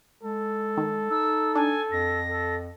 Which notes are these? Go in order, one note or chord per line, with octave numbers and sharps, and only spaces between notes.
G#3 A4
D#3
D#4 E6
D4 G#5
F2 A#6
A4